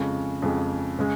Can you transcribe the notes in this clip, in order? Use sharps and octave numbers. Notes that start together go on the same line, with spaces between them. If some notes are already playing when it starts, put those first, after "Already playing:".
Already playing: F2 C#3 G#3
F2 C#3 G#3
C#3 G#3